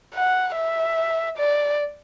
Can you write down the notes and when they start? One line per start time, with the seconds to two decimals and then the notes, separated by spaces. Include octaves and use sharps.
0.14 F#5
0.56 E5
1.38 D5